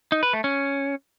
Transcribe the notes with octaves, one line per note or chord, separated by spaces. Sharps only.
D#4
B4
A3
C#4